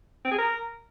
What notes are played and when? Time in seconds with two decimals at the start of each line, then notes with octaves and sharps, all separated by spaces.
0.25 C4
0.32 G#4
0.38 A#4